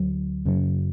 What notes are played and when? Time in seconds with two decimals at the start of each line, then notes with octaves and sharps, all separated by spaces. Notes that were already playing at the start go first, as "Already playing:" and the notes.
Already playing: D2 D3 F#3
0.46 F#2 C#3 F#3